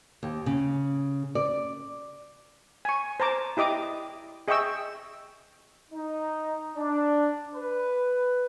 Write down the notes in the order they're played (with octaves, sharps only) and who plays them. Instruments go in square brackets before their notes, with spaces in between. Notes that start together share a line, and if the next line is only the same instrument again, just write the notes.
[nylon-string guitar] D#2
C#3
D5
[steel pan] G#5 C#6
C5 A5 A#5 D6
E4 G4 D#5 D6 D#6
G#4 D#5 E5 G5 C#6 E6
[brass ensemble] D#4
D4
B4